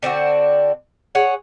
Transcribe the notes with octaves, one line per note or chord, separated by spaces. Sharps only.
D3 C4 D4 F#4
G#4 C#5 F#5